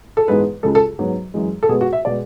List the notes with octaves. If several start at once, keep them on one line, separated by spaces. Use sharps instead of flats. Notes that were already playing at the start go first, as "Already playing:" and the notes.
A4
G#2 E3 G#3 B3 B4
C#2 C#3 G#3 A4
A4
G#2 F#3 B3
F#2 E3 G#3
A4
B2 G#3 B3 G#4
F#4
E5
B2 G#3 D5